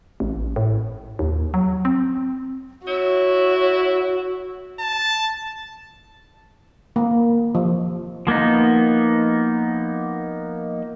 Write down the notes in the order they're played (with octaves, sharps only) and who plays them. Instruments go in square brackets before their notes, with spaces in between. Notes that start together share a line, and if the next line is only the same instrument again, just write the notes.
[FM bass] A1
A2
D#2
F#3
C4
[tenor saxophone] E4 [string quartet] F#4 [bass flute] C#5
[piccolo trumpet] A5
[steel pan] A#3
F3
[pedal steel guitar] F3 A#3 B3 D#4